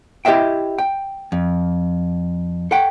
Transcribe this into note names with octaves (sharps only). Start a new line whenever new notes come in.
E4 G4 B4 D#5 E5 G5
G5
F2
A4 F#5 G5